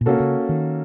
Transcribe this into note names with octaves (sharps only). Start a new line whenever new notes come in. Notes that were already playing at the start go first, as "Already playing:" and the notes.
A#2
C3 A#3 C#4 F#4 A4
C#3
D#3